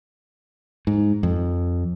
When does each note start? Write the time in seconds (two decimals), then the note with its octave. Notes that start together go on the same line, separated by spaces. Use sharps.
0.87 G#2
1.23 F2